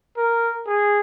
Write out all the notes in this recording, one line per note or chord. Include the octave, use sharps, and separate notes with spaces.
A#4
G#4